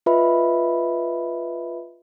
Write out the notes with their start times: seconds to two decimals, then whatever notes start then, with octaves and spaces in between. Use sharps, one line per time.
0.06 F4 B4 D#5 E5 B5